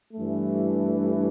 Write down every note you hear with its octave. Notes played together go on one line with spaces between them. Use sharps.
G2 E3 A3